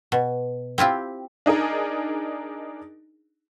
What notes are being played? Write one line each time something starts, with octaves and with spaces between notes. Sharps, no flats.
B2
C4 E4 F4 G4
D4 D#4 G#4 A#4